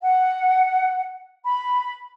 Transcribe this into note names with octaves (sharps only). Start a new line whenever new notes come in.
F#5
B5